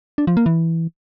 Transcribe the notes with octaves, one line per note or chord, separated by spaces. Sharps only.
D4
F3
A#3
E3